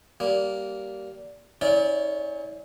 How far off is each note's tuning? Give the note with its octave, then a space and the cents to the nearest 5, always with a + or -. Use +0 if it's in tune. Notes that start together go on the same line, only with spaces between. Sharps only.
G3 -20 A#3 +0
C#4 +0 E4 -45 D5 -20